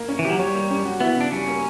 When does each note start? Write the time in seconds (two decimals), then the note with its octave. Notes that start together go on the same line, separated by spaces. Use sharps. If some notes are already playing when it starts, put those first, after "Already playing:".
Already playing: A#3 A#4
0.08 C#4
0.19 E3
0.25 G4
0.30 F#3
0.39 G3 C#5
0.55 A#3
0.71 C#4
0.85 F#4
1.00 B3 E4
1.16 C#3 D4
1.32 G3 C#4
1.48 A#3